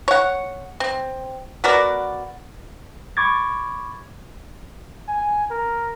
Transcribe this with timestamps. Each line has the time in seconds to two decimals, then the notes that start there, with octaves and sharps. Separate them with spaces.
0.08 C#5 F#5
0.80 C4
1.64 B3 F#4 A#4 D5
3.17 B5 C#6 D6 G#6 A6
5.08 G#5
5.50 A#4